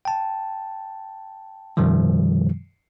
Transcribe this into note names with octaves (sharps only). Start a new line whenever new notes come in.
G5 A5
F#2 B2 D#3 F3 G3